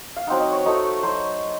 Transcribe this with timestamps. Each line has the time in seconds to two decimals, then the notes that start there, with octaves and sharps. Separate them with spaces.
0.17 F5
0.27 F#3 C4 D#4 F#5
0.40 D#5
0.52 C#5
0.65 F#3 A3 D#4 D#5
1.03 F#3 C5